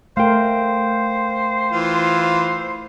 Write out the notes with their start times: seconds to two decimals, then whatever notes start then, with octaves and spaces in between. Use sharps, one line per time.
0.17 A3 A#4 C5 F5 G5
1.72 E3 F4